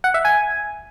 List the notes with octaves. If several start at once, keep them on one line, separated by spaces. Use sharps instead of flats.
F#5
E5
G#5